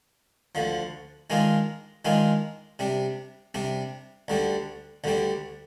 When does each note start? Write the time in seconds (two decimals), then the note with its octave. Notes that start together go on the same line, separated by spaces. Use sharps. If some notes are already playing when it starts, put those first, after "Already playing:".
0.55 D2 D3 F3
1.30 D#3 G#3 D4 F4 G#4
2.05 D#3 G#3 D4 F4 G#4
2.79 C3 G3 D4
3.54 C3 G3 D4
4.28 D2 D3 G3 D4
5.04 D2 D3 G3 D4